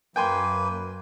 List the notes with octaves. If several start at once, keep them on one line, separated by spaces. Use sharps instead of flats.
F#2 A#3 B4 G5 G#5 C6